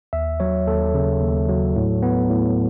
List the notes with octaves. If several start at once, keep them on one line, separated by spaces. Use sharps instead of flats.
D#2 E5
F#3 C#5
D#2 A4
C#3
D#2
F#3
A2
B3
A2